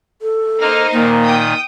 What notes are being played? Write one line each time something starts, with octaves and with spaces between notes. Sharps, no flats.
A4
A#3 D#4 C5 F6
A#2 D#3 A#3
G5 D#6